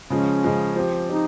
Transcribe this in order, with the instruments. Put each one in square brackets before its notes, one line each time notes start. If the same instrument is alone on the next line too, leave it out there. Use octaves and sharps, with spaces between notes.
[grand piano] C#3 F3 G#3 [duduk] C#4
[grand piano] C#3 F3 G#3
F3 C4 G4
[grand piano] F3 C4 G4 [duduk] D#4